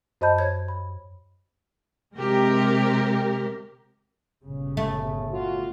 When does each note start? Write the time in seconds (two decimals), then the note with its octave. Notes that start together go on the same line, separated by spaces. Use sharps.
0.21 F#2 C5 D#5 A5 B5 G6
0.39 C#5 G#6
0.68 B5
2.16 C3 G#3 G4 A#4
4.44 G1 A#2 C#3
4.77 A3
5.31 F4 F#4